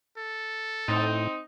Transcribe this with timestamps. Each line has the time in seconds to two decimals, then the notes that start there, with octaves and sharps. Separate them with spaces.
0.18 A4
0.88 A2 C4 D#4